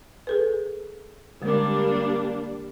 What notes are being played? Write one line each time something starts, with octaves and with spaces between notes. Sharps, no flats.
G#4 A4 B4
D3 G3 G#3 A#3 D4